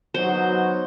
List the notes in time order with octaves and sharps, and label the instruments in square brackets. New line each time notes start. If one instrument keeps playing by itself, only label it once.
[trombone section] B2 F#3 B3 D#4 F#4 [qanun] C5